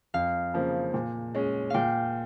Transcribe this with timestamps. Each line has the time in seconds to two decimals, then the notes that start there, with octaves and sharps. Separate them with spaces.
0.14 F2 F5
0.54 C#3 F3 A#3
0.94 A#2
1.35 G#3 C#4
1.70 A#2 F5 G5